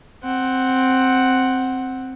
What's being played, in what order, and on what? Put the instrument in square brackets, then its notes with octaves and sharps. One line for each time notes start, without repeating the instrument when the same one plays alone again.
[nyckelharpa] C4 F#5